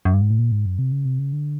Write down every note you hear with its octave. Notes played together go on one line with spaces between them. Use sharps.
F#2
G2
G#2
A2
A#2
G#2
F#2
C3
C#3
C3
C#3
D3